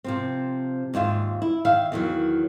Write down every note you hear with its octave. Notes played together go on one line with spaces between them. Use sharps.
C3 F3 C4
D#2 G#2 F4 E5
E4
D#3 E5 F5
E2 D#3 F#3